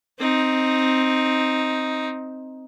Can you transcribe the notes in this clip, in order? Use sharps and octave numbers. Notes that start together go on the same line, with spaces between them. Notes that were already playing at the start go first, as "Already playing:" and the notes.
C4 D#4